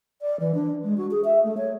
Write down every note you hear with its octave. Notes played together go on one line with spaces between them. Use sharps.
D5
E3
D4
G#3
F#4
G#4
E5
A3
C#5